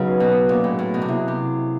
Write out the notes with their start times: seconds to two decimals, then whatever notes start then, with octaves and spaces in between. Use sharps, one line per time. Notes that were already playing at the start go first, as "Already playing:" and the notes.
Already playing: C#3 F#3 B3 C#4 D#4 G#4 B4
0.20 B2
0.49 A#2 A#3 C#4 F#4
0.64 A2
0.79 A2
0.94 B2
1.02 C3
1.08 B2 E4 G#4 C#5 E5
1.28 C3